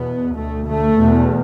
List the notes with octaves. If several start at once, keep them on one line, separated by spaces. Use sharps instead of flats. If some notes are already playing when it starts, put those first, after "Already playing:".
Already playing: E2 B2 B3
D2 A3
A3
E2 B2